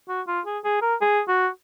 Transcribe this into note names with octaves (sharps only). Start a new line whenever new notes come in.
F#4
F4
G#4
G#4
A#4
G#4
F#4